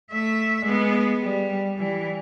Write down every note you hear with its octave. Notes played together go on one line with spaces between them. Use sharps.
A3 E5
G#3 B3
G3
E3 G3